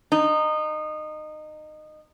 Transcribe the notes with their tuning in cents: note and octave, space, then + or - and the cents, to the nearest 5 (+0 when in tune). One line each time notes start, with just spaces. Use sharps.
D#4 -20